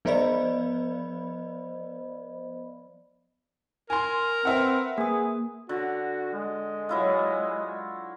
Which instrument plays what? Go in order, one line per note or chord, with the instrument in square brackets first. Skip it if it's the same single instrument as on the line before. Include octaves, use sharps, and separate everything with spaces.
[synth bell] F3 B3 C5 D5 D#5 B5
[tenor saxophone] A#4 [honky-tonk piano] G#5 C6
[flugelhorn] C4 [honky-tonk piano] B4 E5 F#5
[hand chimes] A#3 D#6 [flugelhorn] G#4
[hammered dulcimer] D3 [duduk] F#4
[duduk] G#3
[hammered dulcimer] F#3 E4 F4